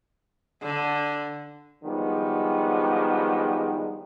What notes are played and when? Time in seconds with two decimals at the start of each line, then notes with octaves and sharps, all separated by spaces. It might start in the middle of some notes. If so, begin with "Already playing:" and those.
0.63 D3
1.83 D#3 F3 G3 G#3 B3 D4